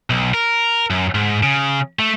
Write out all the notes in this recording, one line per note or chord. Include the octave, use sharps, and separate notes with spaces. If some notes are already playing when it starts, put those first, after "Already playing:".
B1
A#4
F#2
G#2
C#3
A3